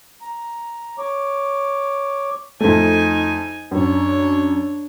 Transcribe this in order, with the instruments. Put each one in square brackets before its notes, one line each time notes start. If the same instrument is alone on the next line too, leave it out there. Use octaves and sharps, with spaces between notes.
[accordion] A#5
C#5 D6
[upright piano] F2 A3 [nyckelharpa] D#4 G#5
[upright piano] F#2 [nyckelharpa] D4 C#5